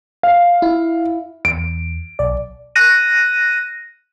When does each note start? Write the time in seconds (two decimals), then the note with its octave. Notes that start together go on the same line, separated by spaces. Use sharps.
0.23 F5
0.62 E4
1.45 E2 D7
2.19 B1 D5
2.75 F#6 A#6 D#7